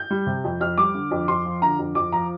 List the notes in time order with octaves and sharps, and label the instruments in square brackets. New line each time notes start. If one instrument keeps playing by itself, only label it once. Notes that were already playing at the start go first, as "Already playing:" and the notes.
Already playing: [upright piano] G6
G3
C3
F2
F2 F6
G3 D6
D3
F2
F2 C6
F3
D3 A#5
F2
F2 D6
F3 A#5